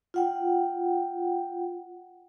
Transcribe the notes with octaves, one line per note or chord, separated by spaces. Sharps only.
F4 F#5 G5